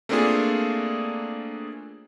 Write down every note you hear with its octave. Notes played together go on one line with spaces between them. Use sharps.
A3 A#3 C4 D4 F4 G#4